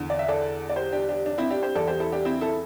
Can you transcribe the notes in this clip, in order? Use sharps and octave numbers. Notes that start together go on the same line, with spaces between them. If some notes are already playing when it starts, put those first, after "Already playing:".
Already playing: E2 D3
D5
E5
A4 D5
D5
G4 C5
D4 G4
D4 G4
D4
C4 E4
D4 G4
G4 C5
E2 E3 A4 D5
G4 C5
E4 A4
D4 G4
C4 E4
E4 A4